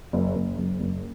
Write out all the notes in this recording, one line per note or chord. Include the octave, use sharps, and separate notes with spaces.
F#1
F#1
F#1
F#1